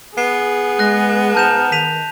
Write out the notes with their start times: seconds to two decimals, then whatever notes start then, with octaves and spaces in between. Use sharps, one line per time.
0.18 B3 G#4 C7
0.79 G#3 F#6 A#6
1.35 G#2 A5 A#5 F6 G6 E7
1.72 D#3 B6 D#7 F7